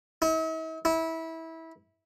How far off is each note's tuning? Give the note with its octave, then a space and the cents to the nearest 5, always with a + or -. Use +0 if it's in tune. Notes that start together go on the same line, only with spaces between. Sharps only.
E4 -45
E4 -20